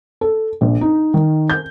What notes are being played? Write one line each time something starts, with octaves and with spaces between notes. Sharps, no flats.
A4
A#1
D#4
D#3
G6